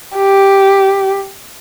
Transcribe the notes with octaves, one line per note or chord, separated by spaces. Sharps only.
G4